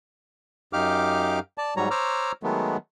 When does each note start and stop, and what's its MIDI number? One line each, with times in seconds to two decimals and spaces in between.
0.73 1.39 42
0.73 1.39 63
0.73 1.39 67
0.73 1.39 77
0.73 1.39 86
0.73 1.39 89
1.58 1.74 74
1.58 1.74 81
1.77 1.89 44
1.77 1.89 54
1.77 1.89 55
1.77 1.89 73
1.77 1.89 82
1.91 2.32 72
1.91 2.32 73
1.91 2.32 82
1.91 2.32 86
1.91 2.32 88
1.91 2.32 89
2.43 2.77 51
2.43 2.77 54
2.43 2.77 56
2.43 2.77 57
2.43 2.77 59